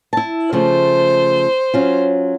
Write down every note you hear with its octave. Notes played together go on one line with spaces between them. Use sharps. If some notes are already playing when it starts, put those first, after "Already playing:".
E4 A5
C#3 F3 A3 C5
F#3 C#4 F4